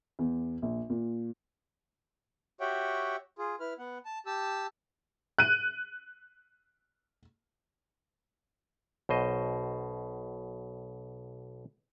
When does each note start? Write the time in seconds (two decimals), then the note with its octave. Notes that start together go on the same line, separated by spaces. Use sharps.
0.19 E2
0.62 A#1
0.90 A#2
2.60 F#4 G4 C#5 E5 F#5 G5
3.38 F4 G#4
3.60 E4 B4 F6
3.78 B3 F#5
4.05 A5
4.26 G4 A5 E6
5.38 F#6 D#7
9.09 B1 B2 C5 D#5